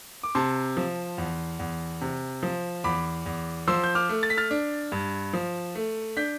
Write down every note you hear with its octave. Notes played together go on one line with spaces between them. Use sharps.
D6
C3 A5 C6
F3
E2
E2
C3
F3
E2 B5 D6
E2
F3 C6 E6
G6
D6 F6
A3
A6
B6
F6 A6
D4
G2
F3
A3
D4 G6 B6